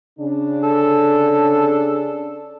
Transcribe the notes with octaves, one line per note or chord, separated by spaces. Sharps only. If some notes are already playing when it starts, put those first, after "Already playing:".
C#3 D4
A4